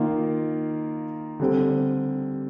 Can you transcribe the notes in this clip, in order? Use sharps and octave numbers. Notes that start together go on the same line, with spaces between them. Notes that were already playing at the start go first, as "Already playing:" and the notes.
Already playing: D#3 A#3 F4
D3 G3 C4